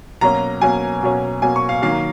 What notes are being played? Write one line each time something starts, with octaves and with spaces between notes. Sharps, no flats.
B2 F#3 A#3 C#4 A#5
B2 F#3 A#3 C#4 G#5
B2 F#3 A#3 C#4
B2 F#3 A#3 C#4 G#5
C#6
F5
D#3 F#3 A#3 F5